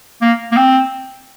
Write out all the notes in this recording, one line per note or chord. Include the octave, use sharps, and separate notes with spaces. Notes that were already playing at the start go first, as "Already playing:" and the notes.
A#3
A#3
C4